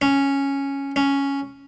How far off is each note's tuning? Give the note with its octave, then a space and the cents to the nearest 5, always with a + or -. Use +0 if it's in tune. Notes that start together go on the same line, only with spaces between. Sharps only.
C#4 -5
C#4 +0